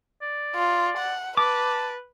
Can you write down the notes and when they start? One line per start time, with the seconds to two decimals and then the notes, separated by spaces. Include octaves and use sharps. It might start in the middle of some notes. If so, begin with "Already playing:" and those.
0.22 D5
0.55 F4
0.98 F#5
1.37 B4 A5 D6